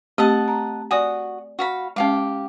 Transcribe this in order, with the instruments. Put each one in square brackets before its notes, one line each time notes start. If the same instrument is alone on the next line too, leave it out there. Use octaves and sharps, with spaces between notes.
[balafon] A3 C4 G4 [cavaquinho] D#5 F#5 A5
[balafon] A#5
[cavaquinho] F#4 D#6 [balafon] D5 G#5
[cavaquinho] F#4 F5 B5
[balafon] G#3 C#4 [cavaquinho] G4 F5 D6